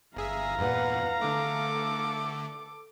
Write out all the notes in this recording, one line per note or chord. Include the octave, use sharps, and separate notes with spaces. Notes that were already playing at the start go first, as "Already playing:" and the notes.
G1 G#4 E5 F5 A#5
E2 G2 A#2 B4 F#5
D3 A3 A4 D6